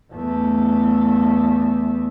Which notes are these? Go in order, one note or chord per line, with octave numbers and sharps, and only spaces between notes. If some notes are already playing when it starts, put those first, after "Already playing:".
E2 A3